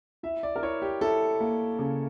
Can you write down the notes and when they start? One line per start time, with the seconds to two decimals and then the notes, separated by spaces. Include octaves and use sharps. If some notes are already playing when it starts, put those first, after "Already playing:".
0.23 E4 E5
0.43 D5
0.56 A#4
0.63 E4 C#5
0.82 G4
1.01 E4 A4
1.40 A#3
1.79 C#3